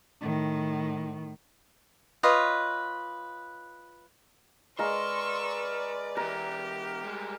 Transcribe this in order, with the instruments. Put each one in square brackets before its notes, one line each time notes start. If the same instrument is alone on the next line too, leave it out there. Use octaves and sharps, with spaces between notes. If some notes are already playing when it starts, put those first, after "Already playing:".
[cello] A2 D#3
[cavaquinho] F4 B4 C#5 D#5
[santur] G#3 A#4 F5 [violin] B4 D5 [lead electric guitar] C6 [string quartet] C#6 E6
[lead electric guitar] B2 E3 [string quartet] G4 [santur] A#4
[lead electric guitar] G3 G#3